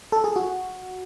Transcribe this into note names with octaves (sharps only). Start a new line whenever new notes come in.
A4
G#4
F#4